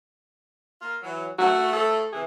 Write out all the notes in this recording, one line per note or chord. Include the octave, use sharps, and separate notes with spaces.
A#3 F4
E3 F#3
A3 F#4
A4
C3 E3 G#4